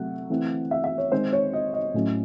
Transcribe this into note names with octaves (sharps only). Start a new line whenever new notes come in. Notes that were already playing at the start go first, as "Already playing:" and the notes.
Already playing: C3 F#3 A3 F#5
E3 A3 C4
E5
E5
C#5
D#3 G#3 C4 C5
C#5
D#5
D#5
A2 F#3 A3 C#4